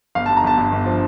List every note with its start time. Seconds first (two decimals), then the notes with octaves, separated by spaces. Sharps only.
0.15 G1 F5
0.26 A5
0.29 G2
0.37 A#5
0.44 G1 A5
0.57 G2
0.72 G1
0.86 F3